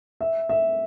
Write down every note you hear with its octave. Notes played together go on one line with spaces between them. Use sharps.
E5
E5